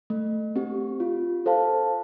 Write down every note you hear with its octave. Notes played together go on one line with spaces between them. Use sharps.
A3
C4 G4
F4
A4 C5 F5 A5